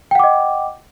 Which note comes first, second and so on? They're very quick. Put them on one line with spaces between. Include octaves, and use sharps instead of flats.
G5 F#5 D6 D#5